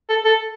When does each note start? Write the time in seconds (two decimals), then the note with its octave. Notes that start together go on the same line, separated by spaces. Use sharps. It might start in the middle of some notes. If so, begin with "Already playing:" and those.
0.09 A4
0.25 A4